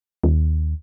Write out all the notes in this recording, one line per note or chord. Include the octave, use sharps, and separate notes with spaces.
D#2